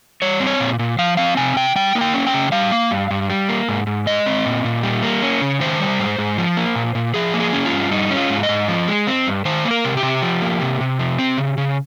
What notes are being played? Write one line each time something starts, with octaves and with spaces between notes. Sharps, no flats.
G3 C#5
C4
C#5
A#2
A#2
F3 F5
C4 F5
C3 G#5
C3 G5
G3 G5
A#3
G5
C#4
G5
C#3
G3 F5
A#3
G2
G2
G3
A#3
G#2
G#2
G#3 D#5
C4
A#2
A#2
G3
A#3
C#4
C#3
D#3 C5
G3
G#2
G#2
F3
A#3
A#2
A#2
F3 G#4
A#3
G#4
C#4
F4
G2
G3 D#4
C#4
F4
G#2
D#5
G#2
F3
G#3
C4
G2
D#3 C5
A#3
A#4
C3
G4
C3
F3
A#3
C3
C3
F3
C4
C#3
C#3